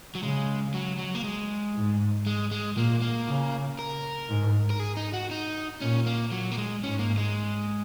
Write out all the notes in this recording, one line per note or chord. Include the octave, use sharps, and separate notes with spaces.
F#3
C#3 G#3
F#3
F#3
A#3
G#3
G#2
G#3
G#3
A#2 A#3
A#3
C#3
A#4
G#2
A#4
G#4
D#4
F#4
D#4
A#2 C#4
A#3
F#3
A#3
G#3
G#2 C#4
A#3
G#3